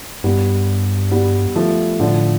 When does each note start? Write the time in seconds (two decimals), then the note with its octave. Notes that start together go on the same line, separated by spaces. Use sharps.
0.24 G2 G3 B3
1.11 G3 B3
1.56 F3 A3
2.00 A2 D3 F3